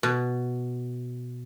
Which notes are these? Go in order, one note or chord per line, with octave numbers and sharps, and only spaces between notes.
B2